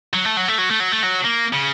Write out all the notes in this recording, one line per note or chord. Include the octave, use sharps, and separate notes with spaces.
F#3
A3
F#3
A3
F#3
A3
F#3
A3
F#3
A#3
C#3